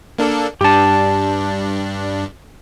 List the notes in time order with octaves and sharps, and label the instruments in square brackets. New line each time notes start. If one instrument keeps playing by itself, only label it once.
[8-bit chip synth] A#3 D4 A4
[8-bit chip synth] G2 D4 [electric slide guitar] G4 A5